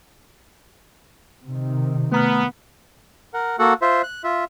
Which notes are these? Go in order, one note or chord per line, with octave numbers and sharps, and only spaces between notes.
C3 D#3
A3 B3 A#5 F6
A#4 F#5
A#3 F#4 A4 F#5
F4 C5 E5
F#6
F4 E5